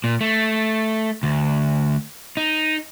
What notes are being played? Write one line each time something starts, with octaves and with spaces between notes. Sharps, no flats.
A#2
A3
D2
D#4